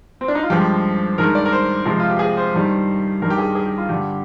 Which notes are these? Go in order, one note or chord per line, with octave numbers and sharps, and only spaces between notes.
C4
D4
D#4
F4
G2 F3 G#3 G4
G2 D#3 G#3 A#4
D5
A#4
C5
C3 F3 G#3
F4
G4
G#4
C5
G2 D#3 G3
G2 D#3 G3 A#4
G4
G#4
G#4
G4
F4
G2 D3 G3 G4